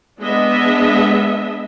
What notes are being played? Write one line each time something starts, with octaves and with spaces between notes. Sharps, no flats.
G#3 B3 D4 D#5 E5